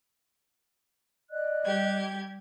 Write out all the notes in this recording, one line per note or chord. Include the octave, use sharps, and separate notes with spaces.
D5 D#5 F#6
G3 G4 G#6